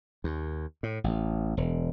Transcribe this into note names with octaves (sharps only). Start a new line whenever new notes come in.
D#2
A2
A1
E1